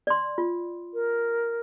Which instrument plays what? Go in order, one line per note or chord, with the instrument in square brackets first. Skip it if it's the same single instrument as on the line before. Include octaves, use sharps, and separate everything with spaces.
[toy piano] D5 C6
F4
[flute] A#4